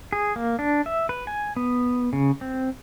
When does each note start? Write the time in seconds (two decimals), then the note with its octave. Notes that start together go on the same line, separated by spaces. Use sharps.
0.13 G#4
0.36 A#3
0.59 D4
0.86 E5
1.09 B4
1.27 G#5
1.56 B3
2.13 C#3
2.41 C4